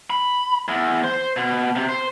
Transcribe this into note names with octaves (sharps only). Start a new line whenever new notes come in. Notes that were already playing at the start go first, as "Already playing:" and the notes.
B5
E2
C5
B2
C3
C5